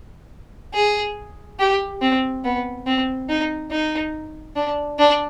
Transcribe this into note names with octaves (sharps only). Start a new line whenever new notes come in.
G#4
G4
C4
B3
C4
D#4
D#4
D4
D4